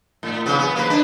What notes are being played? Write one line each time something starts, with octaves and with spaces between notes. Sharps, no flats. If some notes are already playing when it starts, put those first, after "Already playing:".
A2
C#3 B3
B3
A#3 B4
D4